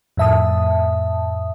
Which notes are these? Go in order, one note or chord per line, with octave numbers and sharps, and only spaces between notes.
F2 A2 E5 A5 D#6